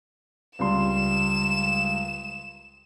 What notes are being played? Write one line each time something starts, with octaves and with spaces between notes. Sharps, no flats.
C#2 G3 C6 E7